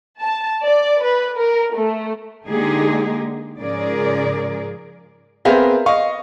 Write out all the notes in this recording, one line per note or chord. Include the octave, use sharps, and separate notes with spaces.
A5
D5
B4
A#4
A3
D3 G#3 A#3 D#4 G4 G#4
G#2 C#3 F3 G#4 A#4 D5
B3 C4 G#4 A#4 E5 F5
D#5 F5 C#6